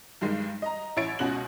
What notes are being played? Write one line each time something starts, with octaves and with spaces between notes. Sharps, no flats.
G2 D#3 G#3
D#5 A#5
A1 E4 C#5 A6 D7
C#2 B2 C#4 F#4 F#6 F#7